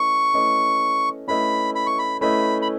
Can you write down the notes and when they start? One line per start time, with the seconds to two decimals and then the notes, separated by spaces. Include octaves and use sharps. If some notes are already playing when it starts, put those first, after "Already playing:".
Already playing: A3 C#4 E4 B4 D#5 C#6
0.34 A3 C#4 E4 B4 D#5
1.28 A3 C#4 E4 B4 D#5 B5
1.75 B5
1.87 C#6
1.99 B5
2.21 A3 C#4 E4 B4 D#5 B5
2.62 B5